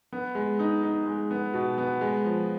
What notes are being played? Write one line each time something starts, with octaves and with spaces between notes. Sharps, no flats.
B3
G#3
D#4
D#4
G#3
B3
B2
B3
G#3
F3